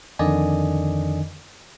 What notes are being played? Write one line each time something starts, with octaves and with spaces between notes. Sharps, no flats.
F2 D3 D#3 D5 D#5 G#5